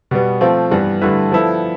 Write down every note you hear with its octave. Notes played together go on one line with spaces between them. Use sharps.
B2 G3 B3
F3 A3 C4 F4
G2 E3 B3
G2 D3 A3 E4 B4
F3 B3 E4 A4